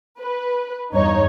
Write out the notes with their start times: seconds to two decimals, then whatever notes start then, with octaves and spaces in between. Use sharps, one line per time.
0.20 B4
0.93 E2 G2 D#4 C#5